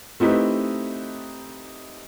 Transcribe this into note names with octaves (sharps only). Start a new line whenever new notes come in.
A3 C4 D#4 E4 G4 B4